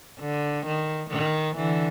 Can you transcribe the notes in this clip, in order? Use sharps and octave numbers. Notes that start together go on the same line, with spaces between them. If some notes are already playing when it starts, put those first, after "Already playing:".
D3
D#3
D#3
D3 E3